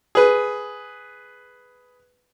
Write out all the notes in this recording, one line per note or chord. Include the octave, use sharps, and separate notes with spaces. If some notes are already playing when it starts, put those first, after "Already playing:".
G#4 B4